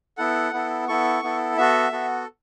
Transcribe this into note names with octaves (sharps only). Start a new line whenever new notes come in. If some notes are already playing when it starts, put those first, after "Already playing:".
B3 E4 A4 F#5
B3 E4 A4
B3 E4 A4 C#6
B3 E4 A4
B3 F#4 A4 E5
B3 F#4 A4